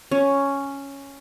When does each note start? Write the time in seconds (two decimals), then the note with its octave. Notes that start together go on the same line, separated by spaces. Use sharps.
0.11 C#4